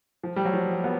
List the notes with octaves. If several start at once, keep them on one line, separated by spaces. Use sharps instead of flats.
F3
G3
F#3
F3
B3